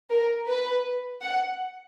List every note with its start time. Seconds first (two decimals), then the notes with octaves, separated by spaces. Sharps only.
0.10 A#4
0.47 B4
1.22 F#5